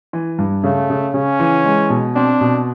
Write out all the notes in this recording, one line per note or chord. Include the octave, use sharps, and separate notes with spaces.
E3
G2
C#3 A3
C#3
C#3 C#4
E3
G#3
B2
C4 D4
B2